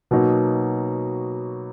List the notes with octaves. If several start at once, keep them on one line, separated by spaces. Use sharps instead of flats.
B2 F#3 A#3 D#4